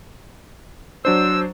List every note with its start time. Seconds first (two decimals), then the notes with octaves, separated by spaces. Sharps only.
1.05 F#3 D4 C5 E6